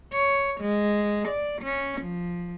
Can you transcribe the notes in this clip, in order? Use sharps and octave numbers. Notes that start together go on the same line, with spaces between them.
C#5
G#3
D5
C#4
F3